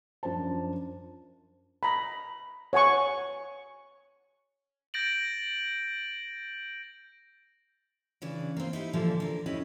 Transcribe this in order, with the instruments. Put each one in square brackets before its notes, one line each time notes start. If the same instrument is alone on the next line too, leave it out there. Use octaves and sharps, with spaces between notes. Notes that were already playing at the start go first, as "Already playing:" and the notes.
[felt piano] F#2 F3 D4 C5 A5
[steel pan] A#5 B5
C#5 F#5 G#5 C#6
[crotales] G6 A6 A#6 D7 F#7
[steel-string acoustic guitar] C#3 E3 D4
A#3 C4
D#4 E4 G4
G2 A#2 D3 E3 F3
D3 A#4
F2 E3 G3 C#4 E4 D#5